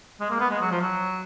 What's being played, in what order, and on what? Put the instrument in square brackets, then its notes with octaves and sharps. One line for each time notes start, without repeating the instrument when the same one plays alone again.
[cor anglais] G#3
A#3
B3
G#3
F#3
F3
F#3